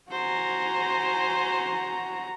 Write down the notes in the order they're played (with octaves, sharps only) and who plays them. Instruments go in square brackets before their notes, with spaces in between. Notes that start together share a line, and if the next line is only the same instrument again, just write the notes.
[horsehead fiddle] F#4 A#5 [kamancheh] C5 G#5